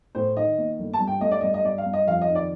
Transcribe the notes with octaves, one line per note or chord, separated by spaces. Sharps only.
A2 C5
D#3 D#5
A#3
G1
A5
G2
G5
A3 D#5
D5
G2 D#5
D#5
G2 D5
F5
G2
D#5
F2 F5
D#5
D#3
D5